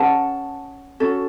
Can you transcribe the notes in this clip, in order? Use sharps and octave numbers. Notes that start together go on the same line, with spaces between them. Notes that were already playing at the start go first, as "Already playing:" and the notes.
Already playing: C#4 G#4 B4 F#5 A5
C#4 F#4 A4